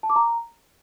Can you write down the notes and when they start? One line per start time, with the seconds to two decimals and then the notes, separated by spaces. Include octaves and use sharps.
0.03 A5
0.10 D6
0.16 A#5